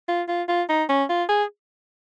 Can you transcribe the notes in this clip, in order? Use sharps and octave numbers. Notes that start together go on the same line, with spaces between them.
F4
F4
F4
D#4
C#4
F4
G#4